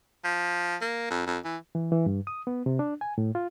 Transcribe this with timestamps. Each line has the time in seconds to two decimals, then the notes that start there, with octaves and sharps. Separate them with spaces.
0.24 F3
0.81 A#3
1.10 F2
1.26 F2
1.44 E3
1.75 E3
1.92 E3
2.06 G2
2.27 D#6
2.47 B3
2.66 C3
2.79 D4
3.01 G#5
3.18 A2
3.35 F4